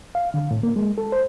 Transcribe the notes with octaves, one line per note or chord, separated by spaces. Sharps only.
F5
D3
A2
A#3
G#3
A4
C5